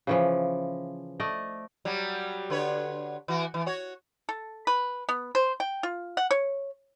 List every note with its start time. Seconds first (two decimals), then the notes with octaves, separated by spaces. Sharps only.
0.07 C#3 E3 F3
1.20 A3 D5 D#5
1.85 F#3 G3
2.50 D3 B4 C#5
3.28 E3 F#4
3.54 E3
3.66 F#4 C#5
4.29 A4
4.67 B4
5.09 B3
5.35 C5
5.60 G5
5.83 F4
6.17 F#5
6.31 C#5